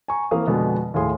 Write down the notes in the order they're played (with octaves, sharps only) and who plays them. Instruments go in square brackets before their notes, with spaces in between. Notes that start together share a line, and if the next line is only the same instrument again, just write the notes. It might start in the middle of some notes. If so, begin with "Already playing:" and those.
[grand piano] G#5 A#5 C#6
E3 A#3 C4 F5 D#6
F2 B2 D3 G#3 B3 D4
D#2 A2 A3 G#4 C6